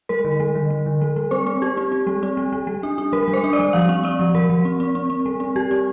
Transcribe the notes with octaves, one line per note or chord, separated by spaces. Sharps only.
G3 A#4
D3
G3
D3
G3
D3
G3
G3
C4 C5
C4
C4 G4
C4
C4
G3
C4
G3
G3
G3
D4
D4
G3 A#4
G3
C5
D4
D5
G3
F3 F5
C4
C4 D5
F3
F3 A#4
F3
C4
C4
C4
C4
G3
C4
G3 G4
C4